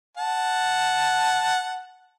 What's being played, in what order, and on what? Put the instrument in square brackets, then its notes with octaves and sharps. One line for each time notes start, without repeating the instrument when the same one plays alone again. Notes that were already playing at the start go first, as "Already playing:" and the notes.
[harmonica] F#5 A5